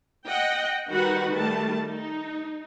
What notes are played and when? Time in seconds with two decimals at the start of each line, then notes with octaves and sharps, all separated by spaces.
0.27 D#5 F#5 G5
0.90 D#3 G3 D#4 F#4 B4 F#5
1.31 D#3 G3 A3 A5
1.84 D#4